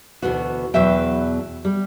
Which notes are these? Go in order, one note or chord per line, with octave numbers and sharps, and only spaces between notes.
D2 B2 E3 B3 F#4
E2 B2 F#3 E5 G5
G3